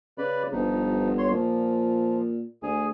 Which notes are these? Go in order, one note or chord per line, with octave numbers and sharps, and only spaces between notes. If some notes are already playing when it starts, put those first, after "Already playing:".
C#3 B4 D5 B5
G1 G2 F3 D#4
C#5 C6
A#2 F3
D2 G#4 G#5